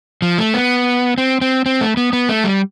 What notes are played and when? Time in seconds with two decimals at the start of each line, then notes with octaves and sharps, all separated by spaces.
0.22 F3
0.39 A3
0.54 B3
1.18 C4
1.41 C4
1.66 C4
1.81 A3
1.97 B3
2.13 B3
2.29 A3
2.44 G3